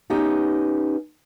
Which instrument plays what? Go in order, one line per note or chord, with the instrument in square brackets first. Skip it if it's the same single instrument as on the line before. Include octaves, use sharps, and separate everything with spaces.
[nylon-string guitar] B3 C#4 D#4 G4